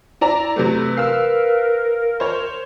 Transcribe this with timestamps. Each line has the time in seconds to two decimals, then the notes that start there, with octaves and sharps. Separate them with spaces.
0.21 E4 D5 A#5
0.56 C3 F#3 A3 B4
0.97 A#4 F5 E6
2.20 C5 C#5